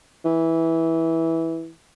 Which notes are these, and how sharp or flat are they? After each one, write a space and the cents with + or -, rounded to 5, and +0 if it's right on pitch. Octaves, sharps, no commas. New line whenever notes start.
E3 -10